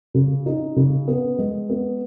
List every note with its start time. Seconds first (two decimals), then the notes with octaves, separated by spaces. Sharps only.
0.14 C#3
0.46 D#4
0.76 C#3
1.08 B3
1.39 G#3
1.69 B3